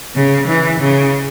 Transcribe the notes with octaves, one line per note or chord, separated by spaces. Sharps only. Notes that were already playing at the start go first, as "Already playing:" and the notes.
C#3
E3
C#3